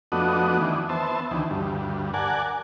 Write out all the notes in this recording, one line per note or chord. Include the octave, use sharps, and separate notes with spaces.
F2 A3 B3 D4 F#4 D#5
D#3 E3 D4
B3 C5 E5 A5
D2 D#3 E3
D2 G2
A#4 D5 F#5 G#5 A5